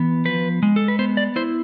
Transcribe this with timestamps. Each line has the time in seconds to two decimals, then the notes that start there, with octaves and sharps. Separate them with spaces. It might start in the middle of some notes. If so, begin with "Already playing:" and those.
Already playing: E3 B3
0.25 F3 B4
0.63 G#3
0.76 A4
0.88 B4
0.99 B3 C5
1.17 D5
1.36 E4 C5